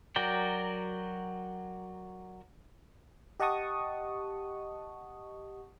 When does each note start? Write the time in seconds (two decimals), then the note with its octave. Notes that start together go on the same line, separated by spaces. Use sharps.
0.16 F#3 F#4 A#4 D5 G5
3.40 G4 D#5 F#5 A5 C#6 D#6